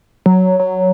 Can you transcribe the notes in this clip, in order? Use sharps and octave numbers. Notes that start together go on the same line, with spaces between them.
F#3
F#3